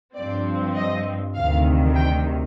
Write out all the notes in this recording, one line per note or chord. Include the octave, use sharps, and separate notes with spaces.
G2 F3 C4 D5
D#5
D2 C3 D#3 F5
G5